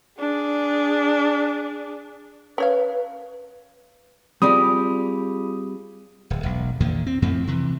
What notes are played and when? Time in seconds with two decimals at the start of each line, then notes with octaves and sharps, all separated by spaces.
0.19 D4 G#4
2.58 C#4 B4 C#5 F5
4.42 G3 C4 F4 G#4 D5 B5 D#6
6.30 D1
6.43 E1 B1
6.80 E2 A#2 D3 D#3
7.07 C4
7.22 F2 A2 F3 C4
7.47 C3 E3